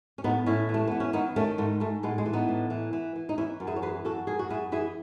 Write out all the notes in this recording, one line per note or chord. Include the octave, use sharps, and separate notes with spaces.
C#4
A2 B3 D#4
A2 C#4 E4
E3
A3
E3 B3
C#4
D#3 B3 D#4
D#3 A3 C#4
G#2 A3
G#2 A3
A2 G#3 B3
G#3
E3
B3 D#4
A2
E3
E3
E3
D#4
E3 C#4 E4
F#2
E4 G#4
C#5
E3 G#4 B4
F#2 F#4 A4
F#2 G#4
F#4
F#2 E4 G#4
E3 E4 G#4